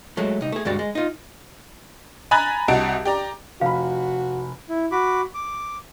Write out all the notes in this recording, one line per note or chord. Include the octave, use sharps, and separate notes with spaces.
F#3 G#3 A3
C2 D#4
A3 G#4
D2 G2 G#3 F#4 D5
G#3
D#4 F4
G#5 A#5 B5 F#6 G#6 A6
C2 G3 F#4 D#5 A5 D7
G4 D5 A#5
F1 F#4 F5 B5
E4
F#4 B5 D6
D6